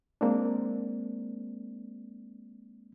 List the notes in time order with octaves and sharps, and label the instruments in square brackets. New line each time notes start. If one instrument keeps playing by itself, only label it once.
[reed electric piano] G#3 A#3 C4 D4